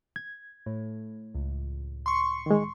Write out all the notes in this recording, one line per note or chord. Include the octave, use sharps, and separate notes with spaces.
G#6
A2
C#2
C6 C#6
D#3 G#3